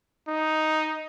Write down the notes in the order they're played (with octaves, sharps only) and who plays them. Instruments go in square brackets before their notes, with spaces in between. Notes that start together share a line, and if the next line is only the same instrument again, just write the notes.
[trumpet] D#4